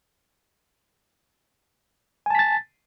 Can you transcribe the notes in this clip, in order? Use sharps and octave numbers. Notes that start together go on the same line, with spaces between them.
G#5 A5 A6 B6